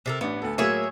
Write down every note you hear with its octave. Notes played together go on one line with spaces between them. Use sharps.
C3 A4 A#4
A1 B3 D4
D2 A4
A2 F#3 A#3 G#4 C#5 E5